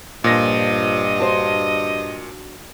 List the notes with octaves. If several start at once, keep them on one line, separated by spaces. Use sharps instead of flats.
G2 A#2 F3 D4 D#5 A#6
D4 F#4 C5